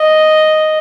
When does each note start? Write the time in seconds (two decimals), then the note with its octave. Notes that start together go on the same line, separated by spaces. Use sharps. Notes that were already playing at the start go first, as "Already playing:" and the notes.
Already playing: D#5